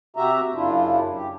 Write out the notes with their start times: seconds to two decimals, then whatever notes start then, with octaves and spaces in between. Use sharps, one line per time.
0.16 C3 F#4 G4 E5 A#5
0.54 F#2 C#3 D4 E4 F4
1.14 G4